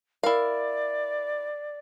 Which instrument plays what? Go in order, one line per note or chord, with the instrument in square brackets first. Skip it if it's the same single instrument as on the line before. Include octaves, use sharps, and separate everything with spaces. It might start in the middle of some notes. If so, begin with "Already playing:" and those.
[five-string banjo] E4 F5 [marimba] A#4 [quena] D5